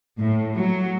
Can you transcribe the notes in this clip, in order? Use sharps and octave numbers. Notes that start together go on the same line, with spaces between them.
A2
F#3